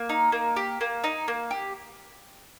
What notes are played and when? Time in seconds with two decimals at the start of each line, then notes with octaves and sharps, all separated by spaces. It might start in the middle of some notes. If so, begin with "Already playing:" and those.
Already playing: A#3
0.09 D#4
0.32 A#3
0.56 G4
0.81 A#3
1.04 D#4
1.28 A#3
1.51 G4